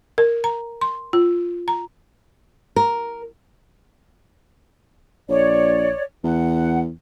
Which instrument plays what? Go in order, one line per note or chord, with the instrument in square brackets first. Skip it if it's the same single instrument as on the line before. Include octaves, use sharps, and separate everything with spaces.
[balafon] A#4
A#5
C6
F4
A#5
[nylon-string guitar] A#4
[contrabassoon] A#1 [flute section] C#5 D5
[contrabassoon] E2 [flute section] F#5